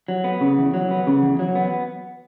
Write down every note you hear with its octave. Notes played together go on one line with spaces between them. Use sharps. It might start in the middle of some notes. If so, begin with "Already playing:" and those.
F#3
B3
C#3
E2
F#3
B3
C#3
E2
F#3
B3